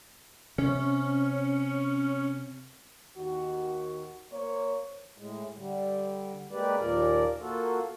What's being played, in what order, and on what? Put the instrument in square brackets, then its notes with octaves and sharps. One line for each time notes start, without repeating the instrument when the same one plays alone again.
[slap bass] C3 [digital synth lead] C#4
[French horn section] D#2 D#3 F#4
A#3 C5 C#5
[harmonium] A2 G#3
D3 G3
G#3 A#3 G4 B4 D5
D#2 A#2 F3 A#4 D5
A#3 F4 F#4 A4